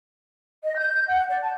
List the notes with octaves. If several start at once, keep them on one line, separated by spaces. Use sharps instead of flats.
D#5
G6
F#5
D5
A5